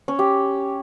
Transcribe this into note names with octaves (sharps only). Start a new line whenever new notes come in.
C#4
G4